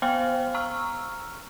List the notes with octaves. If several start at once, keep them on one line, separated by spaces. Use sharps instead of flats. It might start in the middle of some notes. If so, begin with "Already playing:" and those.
B3 C5 F5 G5 G#5 F6
A#5 C#6 E6 F6